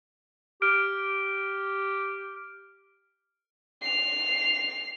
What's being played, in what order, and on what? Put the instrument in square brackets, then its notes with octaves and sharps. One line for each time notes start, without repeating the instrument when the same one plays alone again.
[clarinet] G4 [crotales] F6 D7
[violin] C7 F7